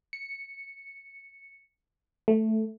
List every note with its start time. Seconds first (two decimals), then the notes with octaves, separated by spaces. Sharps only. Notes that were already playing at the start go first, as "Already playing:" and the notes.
0.13 C#7
2.28 A3